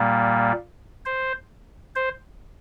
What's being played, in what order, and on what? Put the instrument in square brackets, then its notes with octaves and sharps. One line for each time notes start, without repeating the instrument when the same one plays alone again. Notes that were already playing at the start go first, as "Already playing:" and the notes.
Already playing: [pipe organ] A#2 G3 A#3
C5
C5